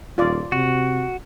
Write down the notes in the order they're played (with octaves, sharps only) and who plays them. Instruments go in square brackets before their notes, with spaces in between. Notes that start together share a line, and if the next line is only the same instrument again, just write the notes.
[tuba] D#1 [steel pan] F4 D5
[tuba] C3 [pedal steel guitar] F#4